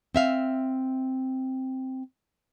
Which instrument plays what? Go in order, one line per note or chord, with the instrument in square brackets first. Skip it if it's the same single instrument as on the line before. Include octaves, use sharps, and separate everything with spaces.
[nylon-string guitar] C4 E5 F5